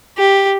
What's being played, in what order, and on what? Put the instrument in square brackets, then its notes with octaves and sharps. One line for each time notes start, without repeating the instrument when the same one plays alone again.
[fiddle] G4